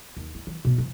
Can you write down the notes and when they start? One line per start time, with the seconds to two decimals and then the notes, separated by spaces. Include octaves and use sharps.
0.17 D#2
0.35 E4
0.47 E3
0.65 B2
0.78 E3